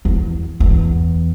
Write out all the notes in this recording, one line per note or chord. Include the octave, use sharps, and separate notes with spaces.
E2
E2